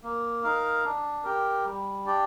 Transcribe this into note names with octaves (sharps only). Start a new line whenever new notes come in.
A#3
D#4 A#4 F5
D4
G4 A#4
G3
D4 G4 D5